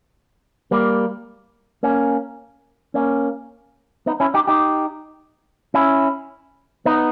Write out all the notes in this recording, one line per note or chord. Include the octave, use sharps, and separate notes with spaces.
G3 A#3
A#3 C#4
A#3 C#4
B3 D#4
C#4 E4
D#4 G4
D#4 G4
C#4 E4
B3 D#4